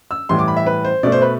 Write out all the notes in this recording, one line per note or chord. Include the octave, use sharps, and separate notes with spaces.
E6
A2 E3 G3 C6
D6
B5
E5
B4
C5
B2 A3 D5
C5
B4